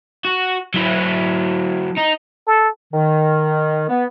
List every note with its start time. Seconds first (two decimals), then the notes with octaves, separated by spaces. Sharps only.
0.25 F#4
0.74 F#3 E4
1.97 D#4
2.47 A4
2.93 D#3
3.89 B3